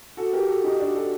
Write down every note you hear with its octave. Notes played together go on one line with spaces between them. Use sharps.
F#4 A4
G4 A#4
F#4 A4
D#4 G4
D4 F#4
F#4 A4